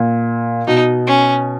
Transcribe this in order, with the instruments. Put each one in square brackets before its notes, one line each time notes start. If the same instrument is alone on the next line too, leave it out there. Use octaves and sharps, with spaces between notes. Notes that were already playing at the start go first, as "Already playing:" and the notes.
Already playing: [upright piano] A#2
[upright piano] B2 [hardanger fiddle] D#4
[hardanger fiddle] C#4